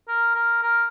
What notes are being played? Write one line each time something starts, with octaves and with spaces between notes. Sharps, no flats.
A#4
A#4
A#4